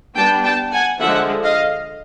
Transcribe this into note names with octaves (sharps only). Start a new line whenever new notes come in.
G3 B3 D4 G5 A5
G5 A5
F#5 G#5
D3 F3 G#3 E5 F#5
D#5 F5